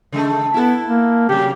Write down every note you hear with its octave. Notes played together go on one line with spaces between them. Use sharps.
C#3 G#3 A3
B3 E4 A4
A#3
C3 F#3 G4